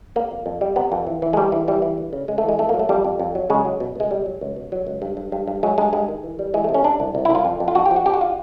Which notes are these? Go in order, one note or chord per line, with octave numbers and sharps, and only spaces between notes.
C3 A#3
F2
F2
G3
C3 B3
F2
E3
E3
G#3
D2 G3
E3
E3 G3
E3
D2
C#3
C#3 G#3
A3
E3
G#3
F2 A3
A#3
F#3
A3
F2 G3
F2
F2
F#3
C#3 G#3
F#3
B2
C#2 G#3
B2 G3
F#3
C#2
B2
F#3
C#2
G2
G2
G2
G2
F#3 G#3
G2 G#3
G2 G#3
D#3
E3
G3
E3 G#3
A3
C3
C#4
C3 D4
C2
C2
E4
C2 F4
F2
F2
F4
F2 F#4
G4
F3
F#4
F2 G4
F#4
F4